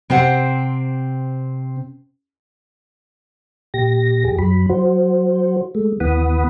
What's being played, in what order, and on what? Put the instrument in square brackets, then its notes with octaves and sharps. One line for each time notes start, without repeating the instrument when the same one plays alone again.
[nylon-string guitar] C3 C4 C5 F5 F#5
[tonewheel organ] A#2 G4 A#6
F2 G4 G#4
F#2 F#3 B5
F#3 F#4 C5
G#3 A3
D#2 E3 B3 F#5 B5 D#6